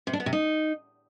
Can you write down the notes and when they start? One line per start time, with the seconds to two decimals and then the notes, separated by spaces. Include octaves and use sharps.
0.07 C3
0.13 D4
0.20 B3
0.26 C3
0.33 D#4